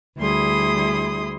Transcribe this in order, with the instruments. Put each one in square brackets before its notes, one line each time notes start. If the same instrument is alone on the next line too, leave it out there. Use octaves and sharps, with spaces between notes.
[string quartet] D2 G3 E4 G#4 C6 D#6